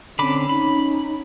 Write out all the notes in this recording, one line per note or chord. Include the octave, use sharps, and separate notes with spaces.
D3 C4 C#4 B5 D6
D#4 B5